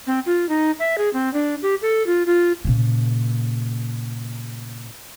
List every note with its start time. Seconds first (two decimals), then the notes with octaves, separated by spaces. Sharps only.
0.07 C4
0.26 F4
0.49 D#4
0.79 E5
0.98 G#4
1.13 C4
1.34 D4
1.62 G4
1.82 A4
2.07 F4
2.26 F4
2.65 A#2 C#3